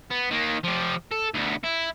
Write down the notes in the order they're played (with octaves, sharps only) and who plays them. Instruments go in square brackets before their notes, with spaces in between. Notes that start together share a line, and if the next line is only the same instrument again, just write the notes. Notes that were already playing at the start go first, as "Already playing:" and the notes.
[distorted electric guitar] B3
D#3 A#3
F3 G4
A4
D2 B3
E4